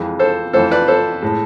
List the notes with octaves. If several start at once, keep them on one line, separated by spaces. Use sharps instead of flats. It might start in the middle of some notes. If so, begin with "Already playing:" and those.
Already playing: F2 E3 G#3
A4 C5
F2 E3 A3 A4 C5
B4 D5
A4 C5
A2 G#3